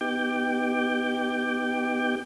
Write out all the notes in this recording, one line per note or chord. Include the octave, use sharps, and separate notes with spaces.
B3 D#4 G4 G5 D6 G6